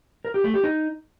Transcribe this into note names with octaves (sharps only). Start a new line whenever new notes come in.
A#4
G4
A3
G4
D#4